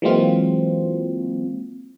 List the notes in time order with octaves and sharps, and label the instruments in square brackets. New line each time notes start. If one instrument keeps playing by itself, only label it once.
[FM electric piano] E3 F#3 G#3 A#3 C4 F4